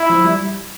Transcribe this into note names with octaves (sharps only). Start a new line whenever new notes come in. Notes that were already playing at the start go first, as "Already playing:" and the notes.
Already playing: E4
F3
G3